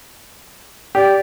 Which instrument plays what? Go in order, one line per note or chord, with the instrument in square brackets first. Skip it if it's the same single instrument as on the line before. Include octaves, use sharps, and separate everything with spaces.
[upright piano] G4 [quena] D5